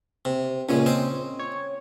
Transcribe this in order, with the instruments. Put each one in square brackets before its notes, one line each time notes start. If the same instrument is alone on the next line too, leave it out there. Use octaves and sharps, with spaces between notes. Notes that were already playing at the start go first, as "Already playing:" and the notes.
[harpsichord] C3
[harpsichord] C#2 A#2 G#3 [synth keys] C#4
[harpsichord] C4 C5 D#5
[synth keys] C#5